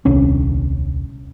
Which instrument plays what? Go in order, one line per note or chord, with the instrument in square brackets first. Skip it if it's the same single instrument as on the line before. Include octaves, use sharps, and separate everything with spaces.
[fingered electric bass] D#1 C2 C#4 D4